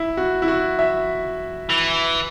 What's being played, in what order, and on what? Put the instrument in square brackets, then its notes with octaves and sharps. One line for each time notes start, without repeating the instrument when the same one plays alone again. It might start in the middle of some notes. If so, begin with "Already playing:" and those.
Already playing: [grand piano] E4
F#4
E4
F#4
E5
[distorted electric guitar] E3